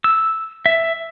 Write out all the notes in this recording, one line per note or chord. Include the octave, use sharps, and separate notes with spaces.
E6
E5